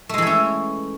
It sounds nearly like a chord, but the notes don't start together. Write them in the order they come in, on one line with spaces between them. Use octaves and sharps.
A3 G#3 E3 A4 C#4